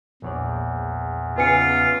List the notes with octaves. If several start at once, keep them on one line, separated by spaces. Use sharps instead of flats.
A#1 E2 C#5 D5
C#3 B3 D#4 F4 B4 G#5 C#7